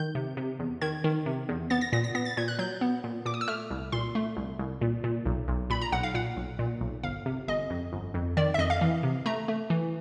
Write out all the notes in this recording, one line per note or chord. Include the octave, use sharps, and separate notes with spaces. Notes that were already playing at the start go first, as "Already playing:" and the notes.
Already playing: D#3 G6
C3
C3
E2
D#3 G#6
D#3
C3
E2
B3 A6
A#6
A#2 A#6
A#6
B3 A#6
A6
A#2 G#6
F#6
F#3 G6
B3
A#2
A#2 D6
D#6
E6
A3 F6
C2
A#2 C6
A3
C2
C2
A#2
A#2
B1
B1
A#2 B5
A#5
B1 F#5
F5
A#2 F#5
B1
A#2
B1
G1 F5
C3
G1 D#5
F2
G1
F2
D#3 D5
E5
F2 D#5
F5
E3
C3
A3 A#5
A3
E3